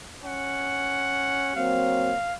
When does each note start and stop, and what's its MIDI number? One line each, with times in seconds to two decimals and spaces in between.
0.24 1.55 61
0.24 1.74 78
1.56 2.13 54
1.56 2.13 58
1.56 2.13 60
1.56 2.35 77